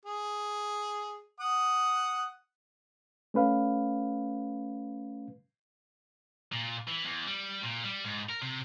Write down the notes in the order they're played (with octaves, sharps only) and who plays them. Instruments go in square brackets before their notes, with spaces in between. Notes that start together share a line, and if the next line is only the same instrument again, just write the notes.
[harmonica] G#4
F#5 D#6
[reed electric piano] A3 C#4 B4 F5
[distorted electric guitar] A#2
E3
E2
G3
A#2
G3
G#2
A#4
C3